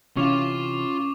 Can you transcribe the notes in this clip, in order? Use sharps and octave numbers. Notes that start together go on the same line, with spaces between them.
C3 E3 C#4 F4 F5 C#6 D6 F7